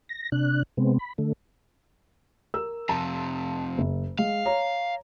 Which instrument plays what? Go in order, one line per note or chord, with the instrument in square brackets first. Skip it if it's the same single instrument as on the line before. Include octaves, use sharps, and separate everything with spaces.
[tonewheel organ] A#6
C3 D4 F#6
C3 G#3 B3 C4
B5
D3 A3
[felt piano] A#4 E6
[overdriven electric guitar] F2 C3 [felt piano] A5
[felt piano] F#1
[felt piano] G#3 [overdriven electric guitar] F5
[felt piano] C#5 A#5